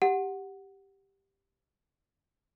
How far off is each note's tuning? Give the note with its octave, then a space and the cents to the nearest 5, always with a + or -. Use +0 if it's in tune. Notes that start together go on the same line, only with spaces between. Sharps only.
G4 +0 F#5 +0